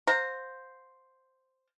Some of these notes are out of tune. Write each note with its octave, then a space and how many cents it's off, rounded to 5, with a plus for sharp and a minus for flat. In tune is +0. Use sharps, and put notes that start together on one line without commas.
C5 +0 F5 +35 A#5 -15